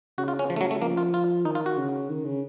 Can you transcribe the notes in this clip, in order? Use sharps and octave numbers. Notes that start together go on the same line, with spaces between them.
C#3 F#4
F4
C#4
F3
A3
F#3
A3
F3 A#3
F4
F4
D#3 D#4
F4
F#4
C#3
D#3
C#3